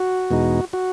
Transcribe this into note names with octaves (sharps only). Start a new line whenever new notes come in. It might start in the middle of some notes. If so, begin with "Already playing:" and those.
Already playing: F#4
E2 B2 G#3 D#4
F#4